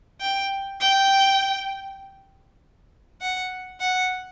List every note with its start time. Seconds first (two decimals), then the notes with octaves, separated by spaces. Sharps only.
0.21 G5
0.81 G5
3.22 F#5
3.80 F#5